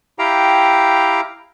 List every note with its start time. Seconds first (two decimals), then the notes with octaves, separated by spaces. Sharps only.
0.19 E4 G4 F5 G5 A#5